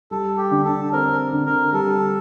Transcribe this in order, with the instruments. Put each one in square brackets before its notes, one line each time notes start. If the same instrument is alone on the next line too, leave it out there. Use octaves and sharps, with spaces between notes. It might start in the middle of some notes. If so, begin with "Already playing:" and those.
[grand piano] G3 [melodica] A4
[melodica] G4
[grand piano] D3
[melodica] A4
[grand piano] C4 [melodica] A#4
[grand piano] D3
[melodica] A#4
[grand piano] G3 [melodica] A4